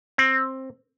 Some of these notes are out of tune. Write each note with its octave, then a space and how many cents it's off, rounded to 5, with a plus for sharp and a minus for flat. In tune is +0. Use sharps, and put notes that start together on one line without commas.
C4 +15